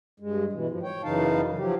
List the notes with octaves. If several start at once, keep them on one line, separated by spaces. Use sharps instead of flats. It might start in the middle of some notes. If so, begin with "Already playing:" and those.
G2 G#3
B2 E3
G#2 F3
C#5 G5
F#2 C#3 E3 D#4 F5 A5
F3 F#3 G4